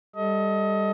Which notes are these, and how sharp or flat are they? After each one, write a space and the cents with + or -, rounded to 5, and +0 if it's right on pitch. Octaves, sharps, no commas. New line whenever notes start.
G3 +20 A4 +0 D#5 +25